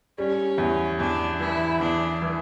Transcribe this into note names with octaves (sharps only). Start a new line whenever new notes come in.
G3 C#4
E2
E2 D4
E3 E4
E2 D4
E3